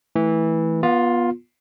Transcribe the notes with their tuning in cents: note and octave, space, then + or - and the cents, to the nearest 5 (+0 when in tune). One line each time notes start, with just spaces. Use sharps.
E3 -15 A3 -10
B3 -25 F4 +10